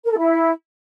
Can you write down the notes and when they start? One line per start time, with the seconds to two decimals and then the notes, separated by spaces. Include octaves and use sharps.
0.05 A#4
0.11 A4
0.17 E4